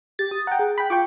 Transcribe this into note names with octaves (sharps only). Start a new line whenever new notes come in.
G4 A6
D#6
F#5 G5 A#5
G#4
G5 B5
F4 G5 C#6 D6